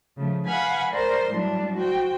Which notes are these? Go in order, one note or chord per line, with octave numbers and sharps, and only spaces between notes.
C#3 F3 A3
B4 F5 F#5 G#5 B5
A#4 C5 D5 C6
A2 F#3 G3 D4
F#4 C5 G5